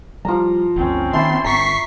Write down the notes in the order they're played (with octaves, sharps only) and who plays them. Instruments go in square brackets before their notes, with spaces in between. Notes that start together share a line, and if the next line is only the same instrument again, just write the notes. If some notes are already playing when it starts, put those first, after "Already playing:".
[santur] F3 A#5 [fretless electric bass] G3
[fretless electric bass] G1 D2 [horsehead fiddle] C4 C#4
[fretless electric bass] D#3 A#3 [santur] E5 A5 B5 [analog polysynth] C6
[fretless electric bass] G1 [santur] A#5 [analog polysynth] C#6 B6 C7